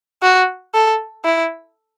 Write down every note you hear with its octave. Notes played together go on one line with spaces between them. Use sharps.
F#4
A4
E4